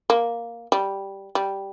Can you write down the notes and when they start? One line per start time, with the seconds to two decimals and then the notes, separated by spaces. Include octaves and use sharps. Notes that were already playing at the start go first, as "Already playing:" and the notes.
0.10 A#3
0.72 G3
1.35 G3